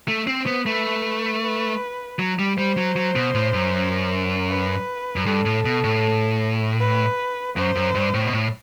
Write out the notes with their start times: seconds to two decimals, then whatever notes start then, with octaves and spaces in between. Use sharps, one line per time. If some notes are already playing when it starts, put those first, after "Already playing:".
0.08 A3
0.27 C4 C5
0.46 B3
0.66 A3 B4
1.43 B4
2.19 F#3
2.39 G3
2.57 G3 C5
2.77 F#3
2.96 F#3
3.16 B2
3.34 A2
3.54 F#2
4.49 B4
5.16 F#2
5.26 G2 A4
5.45 A2
5.65 B2
5.84 A2
6.80 B4
7.56 F#2 C5
7.76 F#2
7.95 G2
8.14 A2
8.25 B2
8.33 A2